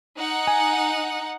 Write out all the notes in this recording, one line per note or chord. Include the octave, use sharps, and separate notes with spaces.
D#4 F#5
G#5